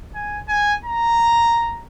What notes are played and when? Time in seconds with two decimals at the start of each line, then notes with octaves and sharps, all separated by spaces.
0.14 G#5
0.49 G#5
0.85 A#5